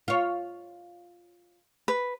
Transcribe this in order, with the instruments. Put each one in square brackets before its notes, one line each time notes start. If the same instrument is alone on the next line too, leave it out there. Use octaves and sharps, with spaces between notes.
[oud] F4 C#5
[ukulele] B4